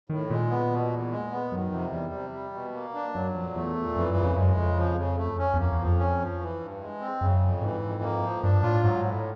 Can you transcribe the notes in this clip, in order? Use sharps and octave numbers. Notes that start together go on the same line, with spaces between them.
A2 D#3
A#2 G#3
B3
B2
E2
G#3
B3
F#2 D#3
F2 C3
E2 G3
C3
G3
B2
A#3
D4
F#2 F#3
F2 A#2
E2 A3
A#2
F2 E3
F#2
C#3
F2
F#2 G#3
F2 C#3
F3
C#3
A3
C#4
E2
F2 A#3
E2
F3
F2
C#4
F3
E3
G2
G#3
C4
F#2 C#3
F2
G#2 E3
F2
A#3
F3
G2 D4
A2 F4
G#2 F#3
A2